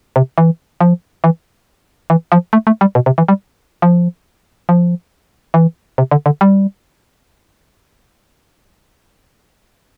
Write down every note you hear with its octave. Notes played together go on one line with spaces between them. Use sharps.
C3
E3
F3
E3
E3
F3
A3
A3
G3
B2
C3
E3
G3
F3
F3
E3
C3
D3
D3
G3